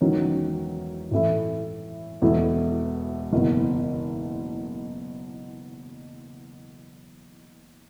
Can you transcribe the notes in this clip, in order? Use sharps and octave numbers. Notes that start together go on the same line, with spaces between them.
E1 E2 D#3 F#3 C#4
A2 E3 A3 E4
E1 E2 B2 A3 E4
F#1 E2 B2